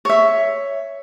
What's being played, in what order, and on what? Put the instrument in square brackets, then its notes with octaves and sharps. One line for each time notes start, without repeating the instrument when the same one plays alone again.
[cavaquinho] C#5 E5